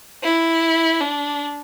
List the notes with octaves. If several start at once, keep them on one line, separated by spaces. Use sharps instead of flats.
E4
D4